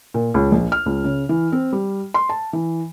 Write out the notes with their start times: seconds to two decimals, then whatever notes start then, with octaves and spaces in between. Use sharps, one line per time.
0.14 A#2
0.34 C#2
0.52 A#1
0.72 F6
0.86 C#2
1.04 C#3
1.29 E3
1.52 C4
1.73 G3
2.14 C6
2.29 A5
2.53 E3